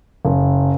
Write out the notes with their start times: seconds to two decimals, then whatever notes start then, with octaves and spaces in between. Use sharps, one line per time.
0.25 F#1